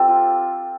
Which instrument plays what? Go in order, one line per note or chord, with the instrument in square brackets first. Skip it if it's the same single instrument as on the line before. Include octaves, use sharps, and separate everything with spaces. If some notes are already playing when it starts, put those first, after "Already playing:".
Already playing: [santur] F3 C4 G4 A4
F4